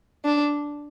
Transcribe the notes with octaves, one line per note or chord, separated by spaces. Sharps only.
D4